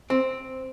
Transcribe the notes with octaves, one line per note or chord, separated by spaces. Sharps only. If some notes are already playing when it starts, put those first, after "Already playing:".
C4